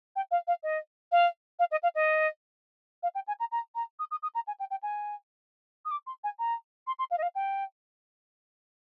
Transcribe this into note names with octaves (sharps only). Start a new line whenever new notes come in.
G5
F5
F5
D#5
F5
F5
D#5
F5
D#5
F5
G5
G#5
A#5
A#5
A#5
D#6
D#6
D#6
A#5
G#5
G5
G5
G#5
D#6
D6
C6
G#5
A#5
C6
C6
F5
D#5
F5
G5